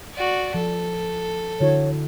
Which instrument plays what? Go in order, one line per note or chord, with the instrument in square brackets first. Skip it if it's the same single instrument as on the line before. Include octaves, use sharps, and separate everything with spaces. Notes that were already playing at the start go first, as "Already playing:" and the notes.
[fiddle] F#4 D5
[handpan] F3 [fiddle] A4
[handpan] D3 E4 F#4 [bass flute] C#5